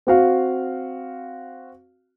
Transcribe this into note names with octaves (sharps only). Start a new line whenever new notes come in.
C4 F#4 F5